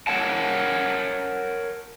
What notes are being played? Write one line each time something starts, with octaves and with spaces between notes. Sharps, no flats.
A#4 C#5 F#5 A5